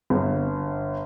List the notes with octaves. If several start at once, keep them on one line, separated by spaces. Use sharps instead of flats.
G1